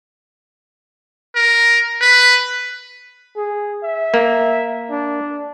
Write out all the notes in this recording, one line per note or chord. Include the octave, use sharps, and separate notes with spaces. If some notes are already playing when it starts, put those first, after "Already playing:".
A#4
B4
G#4
E5
A#3
D4